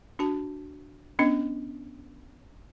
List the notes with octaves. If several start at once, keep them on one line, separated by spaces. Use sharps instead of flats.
D4 F#4 A5
B3 C#4 D4 D#5